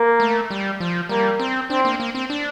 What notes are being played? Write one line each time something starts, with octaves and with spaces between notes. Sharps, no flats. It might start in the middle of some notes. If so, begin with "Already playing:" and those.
Already playing: A#3
A3
G3
F3
G3 A#3
C4
C4 D4
A#3
A#3
C4
D4